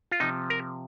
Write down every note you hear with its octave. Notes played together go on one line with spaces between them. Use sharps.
F4
C3 F3 D#4
A#4